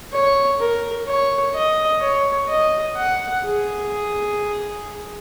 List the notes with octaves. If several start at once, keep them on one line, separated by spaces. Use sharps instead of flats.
C#5
A#4
C#5
D#5
C#5
D#5
F#5
G#4